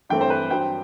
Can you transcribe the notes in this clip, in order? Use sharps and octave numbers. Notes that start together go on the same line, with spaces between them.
G2 E3 A3 C4 G5
C5
B4
G2 F#3 C4 G5